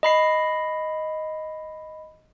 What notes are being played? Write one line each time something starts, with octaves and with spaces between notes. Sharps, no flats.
D#5 B5 C7